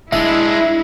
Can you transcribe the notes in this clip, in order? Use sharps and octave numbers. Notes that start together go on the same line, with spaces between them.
D#1 G#3 D4 E4 E5